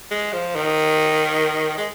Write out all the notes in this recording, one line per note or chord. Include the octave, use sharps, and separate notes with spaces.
G#3
F3
D#3
G#3